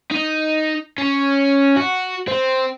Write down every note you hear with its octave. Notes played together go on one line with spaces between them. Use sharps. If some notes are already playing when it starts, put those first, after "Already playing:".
D#4
C#4
F#4
C4